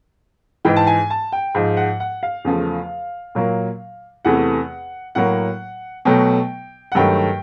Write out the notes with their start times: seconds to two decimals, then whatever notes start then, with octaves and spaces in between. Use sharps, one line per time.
0.65 G#2 E3 G#3 G5
0.76 A5
0.87 G#5
1.10 A5
1.32 G5
1.55 G#2 F3 G#3
1.77 F#5
2.00 F#5
2.23 F5
2.45 E2 C#3 F3 A3
3.35 A#2 F#3 A#3
4.25 E2 C3 E3 A3 F#5
5.15 A2 F#3 A#3 F#5
6.05 B2 F#3 A3 G5
6.92 F#5
6.95 G2 D#3 F#3 A3 G5